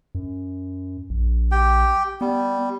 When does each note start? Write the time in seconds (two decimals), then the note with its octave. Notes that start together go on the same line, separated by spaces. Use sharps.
0.15 F#2
1.10 A#1
1.51 G4 G5
2.21 G3 B3